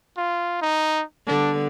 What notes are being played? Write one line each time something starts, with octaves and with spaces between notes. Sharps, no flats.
F4
D#4
D3 G3 B3 D4